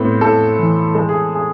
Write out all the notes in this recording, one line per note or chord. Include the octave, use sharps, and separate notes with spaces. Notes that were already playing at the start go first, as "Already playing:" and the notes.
Already playing: A2 B3 C4
A2 A4
E3
G#3 A4
G#4
G#4